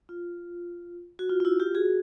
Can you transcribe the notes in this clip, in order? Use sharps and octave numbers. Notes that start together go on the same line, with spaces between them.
F4
F#4
F4
F4
E4 F#4
F4 G4
F#4 G#4